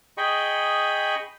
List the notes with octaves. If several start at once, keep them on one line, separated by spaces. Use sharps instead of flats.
G#4 D#5 G5 B5 C#6